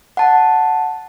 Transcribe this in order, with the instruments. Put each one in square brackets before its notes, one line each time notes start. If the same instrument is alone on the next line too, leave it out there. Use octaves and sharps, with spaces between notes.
[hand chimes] F#5 A5